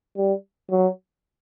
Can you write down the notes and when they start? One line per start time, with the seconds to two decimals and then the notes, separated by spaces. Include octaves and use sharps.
0.17 G3
0.71 F#3